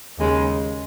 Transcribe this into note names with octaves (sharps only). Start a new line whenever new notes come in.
D#2 C#3 G#3